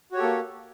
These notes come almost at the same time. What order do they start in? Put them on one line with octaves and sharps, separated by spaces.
F#4 C#5 G4 A4 A#3